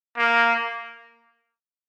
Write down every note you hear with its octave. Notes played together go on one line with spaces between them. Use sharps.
A#3